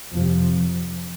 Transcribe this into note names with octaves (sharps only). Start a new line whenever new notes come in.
F2 C3 F3